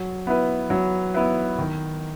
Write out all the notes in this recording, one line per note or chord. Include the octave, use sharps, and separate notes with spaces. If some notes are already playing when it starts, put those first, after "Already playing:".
Already playing: F#3
B3 E4 B4
F#3
B3 E4 B4
D#3